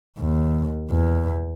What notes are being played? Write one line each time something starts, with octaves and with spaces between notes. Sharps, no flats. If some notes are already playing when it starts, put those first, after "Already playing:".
D#2
E2